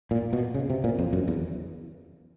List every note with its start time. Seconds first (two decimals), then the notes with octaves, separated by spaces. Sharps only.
0.11 A#2
0.33 B2
0.54 C#3
0.70 C3
0.84 A#2
0.99 F2
1.13 F#2
1.28 E2